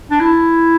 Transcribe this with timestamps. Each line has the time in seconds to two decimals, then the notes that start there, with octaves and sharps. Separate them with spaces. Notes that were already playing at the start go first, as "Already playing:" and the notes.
0.11 D4
0.20 E4